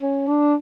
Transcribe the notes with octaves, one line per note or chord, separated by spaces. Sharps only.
C#4
D4